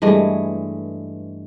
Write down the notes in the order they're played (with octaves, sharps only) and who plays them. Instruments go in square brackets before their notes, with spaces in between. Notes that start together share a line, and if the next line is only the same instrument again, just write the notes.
[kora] G2 E3 G#3 A3